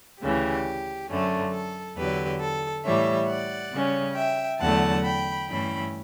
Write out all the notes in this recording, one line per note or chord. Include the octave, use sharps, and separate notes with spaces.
D2 C#3 E3 G4
F#2 D3 A3 C#4
A4
E2 D3 F#3 G4 B4
A4
A2 E3 G3 C#5 E5
D5 F#5
C#3 G3 C#4
E5 G5
E2 D3 F#3 A3 F#5 A5
G5 B5
G2 E3 A3 C#4 G5 B5